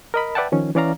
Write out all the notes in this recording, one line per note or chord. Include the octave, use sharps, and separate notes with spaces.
A#4 D#5 B5
B4 D5 E5 F#5 G5 A5
D#3 F3 C#4
E3 C#4 D5 F5 A#5